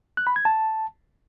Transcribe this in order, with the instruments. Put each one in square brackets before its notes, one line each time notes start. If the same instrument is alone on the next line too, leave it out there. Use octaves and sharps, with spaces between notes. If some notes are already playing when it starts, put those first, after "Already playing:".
[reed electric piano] F#6
B5
G#6
A5